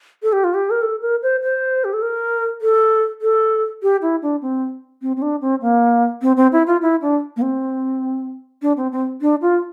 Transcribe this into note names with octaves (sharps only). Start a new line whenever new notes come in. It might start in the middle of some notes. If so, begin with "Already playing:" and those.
A4
G4
F4
G4
A#4
A4
A#4
C5
C5
G4
A4
A#4
A4
A4
G4
E4
D4
C4
C4
C4
D4
C4
A#3
C4
C4
E4
F4
E4
D4
A#3
C4
D4
C4
C4
D4
F4